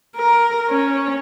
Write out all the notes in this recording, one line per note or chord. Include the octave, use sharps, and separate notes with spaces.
A#4
C#4